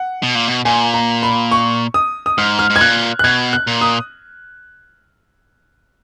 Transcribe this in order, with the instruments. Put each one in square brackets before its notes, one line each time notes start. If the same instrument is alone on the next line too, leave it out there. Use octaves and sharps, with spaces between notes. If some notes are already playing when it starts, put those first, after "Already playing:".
Already playing: [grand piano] F#5
[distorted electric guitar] B2
A#2
B2
[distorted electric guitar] A#2 [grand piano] G#5
[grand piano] A#5
B5
C#6
D#6
D#6
[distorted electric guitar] G#2 [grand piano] F6
[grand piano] F6
[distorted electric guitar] G#2
[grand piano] G#6
[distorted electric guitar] A#2 [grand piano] F#6
[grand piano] F#6
[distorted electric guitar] B2 [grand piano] G#6
[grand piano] F#6
[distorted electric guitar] A#2
[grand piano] D#6